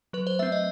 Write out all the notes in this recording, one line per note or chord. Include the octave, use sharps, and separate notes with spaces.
F#3 B4
C5
A3 C4 E5
D#5